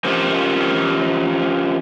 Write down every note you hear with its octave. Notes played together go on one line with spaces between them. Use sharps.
F3 C#4 G4 A#4 C5